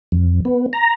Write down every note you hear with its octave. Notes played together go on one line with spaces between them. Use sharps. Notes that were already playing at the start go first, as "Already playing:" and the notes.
F2
B3
A#5